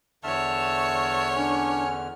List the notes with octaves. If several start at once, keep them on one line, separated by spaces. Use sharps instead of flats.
E2 D3 C#5 E5 A5 F6
C#4 D4